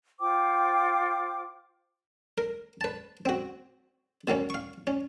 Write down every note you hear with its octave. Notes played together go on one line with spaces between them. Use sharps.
F4 C5 G5 D6
A#4
B4 A5
C4 F#4
B2 E3 A#3 C#4
F5 C#6
C#4